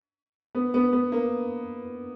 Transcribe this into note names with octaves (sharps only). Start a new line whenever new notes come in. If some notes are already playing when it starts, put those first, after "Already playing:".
B3
B3
B3
A#3